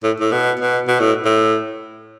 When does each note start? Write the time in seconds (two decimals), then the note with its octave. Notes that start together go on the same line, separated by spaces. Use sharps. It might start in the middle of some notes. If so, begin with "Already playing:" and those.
0.03 A2
0.20 A2
0.32 B2
0.60 B2
0.88 B2
1.00 A2
1.25 A2